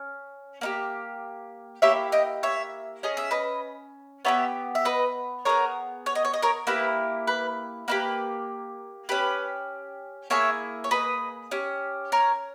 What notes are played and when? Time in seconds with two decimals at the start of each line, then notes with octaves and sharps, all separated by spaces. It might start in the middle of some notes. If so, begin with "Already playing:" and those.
Already playing: C#4
0.61 A#3 D#4 G4
1.82 A#3 E4 G4 C#5 E5
2.12 D#5 G5
2.43 C#5 E5
3.03 C#4 G#4 D#5
3.17 E5
3.31 B4 D#5
4.25 B3 D#4 G4 C#5 E5
4.75 E5
4.85 B4 D#5
5.45 B3 E4 G#4 A#4 C#5
6.06 C#5
6.15 D#5
6.25 C#5
6.34 D#5
6.43 A#4 C#5
6.67 A#3 E4 G4 B4
7.27 B4
7.88 A#3 E4 G4 B4
9.09 C#4 G4 B4
10.30 A#3 E4 G#4 C#5 E5
10.84 C#5
10.91 B4 D#5
11.51 C#4 G4
12.12 A#4 C#5